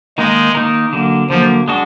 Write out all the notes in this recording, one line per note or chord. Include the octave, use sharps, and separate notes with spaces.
D#3 G#3 A#3 D#4 A#4
D#3 A#3 D#4 A#4
D3 F#3 A#3
D3 F3 F#3 A#3
G#3 D4 F#4